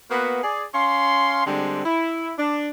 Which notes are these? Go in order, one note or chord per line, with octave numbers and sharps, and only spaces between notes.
A#3 B3 F#4 B4
G#4 D5
C#4 F5 C6
D3 G3 G#3 C4
E4
D4